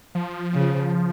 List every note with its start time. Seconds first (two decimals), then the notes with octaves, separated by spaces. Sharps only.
0.15 F3
0.54 C#3